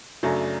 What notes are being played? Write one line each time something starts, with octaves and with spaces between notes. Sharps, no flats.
F#2 C#3 F#3 A3 D4